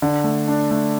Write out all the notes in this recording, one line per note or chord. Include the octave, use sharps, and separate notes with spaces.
D3
A3
D4
A3